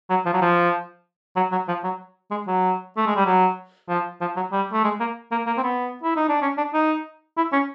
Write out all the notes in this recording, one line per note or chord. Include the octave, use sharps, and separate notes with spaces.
F#3
F3
F#3
F3
F#3
F#3
F3
F#3
G#3
F#3
A3
G#3
G3
F#3
F3
F3
F#3
G3
A3
G#3
A#3
A#3
A#3
C4
B3
E4
D#4
D4
C#4
D4
D#4
E4
C#4